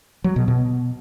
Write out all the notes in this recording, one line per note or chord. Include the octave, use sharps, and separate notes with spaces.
F#3
B2
B2